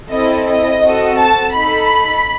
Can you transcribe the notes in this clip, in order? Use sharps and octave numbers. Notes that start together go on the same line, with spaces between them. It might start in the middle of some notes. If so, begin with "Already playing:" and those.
C4 E4 A4 D#5
D#5
C4 F#4 A4
A5
D#4 A4 B5